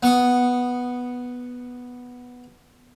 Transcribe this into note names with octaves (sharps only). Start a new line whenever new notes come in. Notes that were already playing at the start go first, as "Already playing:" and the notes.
B3 C#6 D#6